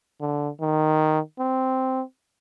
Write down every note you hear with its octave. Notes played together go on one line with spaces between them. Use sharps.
D3
D#3
C4